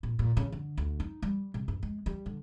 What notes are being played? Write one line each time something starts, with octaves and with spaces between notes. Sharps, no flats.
A#2
A#2
C#3
D3
D2
D#4
G3
C3
G2
G#3
G3
D3